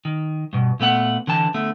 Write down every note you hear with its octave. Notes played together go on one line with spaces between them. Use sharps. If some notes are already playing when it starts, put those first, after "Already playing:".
D#3
G2 B2
A#2 A3 B3 F#5
D3 E3 G5 A5
D3 A3 B3